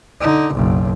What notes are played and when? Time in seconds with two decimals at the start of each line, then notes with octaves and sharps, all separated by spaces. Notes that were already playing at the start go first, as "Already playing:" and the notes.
0.21 D3 D#4
0.54 F#1 B1